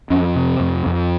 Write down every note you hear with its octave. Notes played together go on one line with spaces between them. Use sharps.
F2 C#4
C3
F2
F2